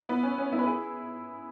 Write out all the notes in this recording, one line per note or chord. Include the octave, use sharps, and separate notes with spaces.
B3 E4
C#4
C#4
B3 E4
B4
E4 G#4